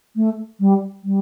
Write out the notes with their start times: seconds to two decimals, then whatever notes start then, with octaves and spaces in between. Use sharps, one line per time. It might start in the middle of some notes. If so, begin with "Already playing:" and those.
0.16 A3
0.60 G3
1.04 G3